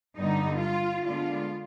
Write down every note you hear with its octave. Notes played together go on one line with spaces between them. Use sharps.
G2 D3 G3 B3 D#4
F4
D3 G#3 B3 D4 F4